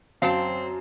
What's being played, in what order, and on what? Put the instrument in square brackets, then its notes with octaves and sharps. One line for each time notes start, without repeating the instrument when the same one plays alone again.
[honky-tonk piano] F#2 [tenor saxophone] C4 [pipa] F5 A5